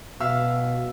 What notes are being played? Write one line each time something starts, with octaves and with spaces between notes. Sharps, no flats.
B2 E5 F5 E6